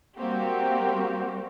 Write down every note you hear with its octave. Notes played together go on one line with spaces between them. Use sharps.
G3 A#3 C4 F#4 G4